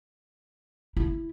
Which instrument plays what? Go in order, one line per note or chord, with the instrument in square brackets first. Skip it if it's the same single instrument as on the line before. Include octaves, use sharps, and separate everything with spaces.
[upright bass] E4